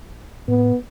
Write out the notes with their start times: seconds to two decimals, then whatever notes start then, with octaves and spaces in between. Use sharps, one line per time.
0.48 A2 B3